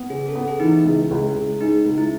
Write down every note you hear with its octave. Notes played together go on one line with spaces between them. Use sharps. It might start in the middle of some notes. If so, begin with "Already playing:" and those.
Already playing: B3
C#3 G#4
A4
B3
G#4
E3 D#4
E4
C#2
C#2
C#2
G#3 D#4
C#2
E4